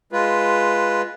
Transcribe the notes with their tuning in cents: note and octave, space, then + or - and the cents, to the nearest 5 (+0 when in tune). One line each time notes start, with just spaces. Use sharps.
G#3 +0 F4 -5 B4 -5